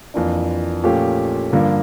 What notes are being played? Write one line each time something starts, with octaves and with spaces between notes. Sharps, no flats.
F2 E3 A#3 D4
A#2 F3 A3 C#4 G4
G2 D3 F3 A#3